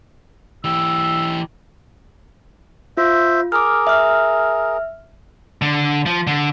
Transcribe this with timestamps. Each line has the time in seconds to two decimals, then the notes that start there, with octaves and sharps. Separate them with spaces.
0.64 E3 G4 E6
2.97 F4 C5 E5
3.52 G#4 A#4 D6 F6
3.87 E5 F6
5.62 D3
6.06 F3
6.27 D3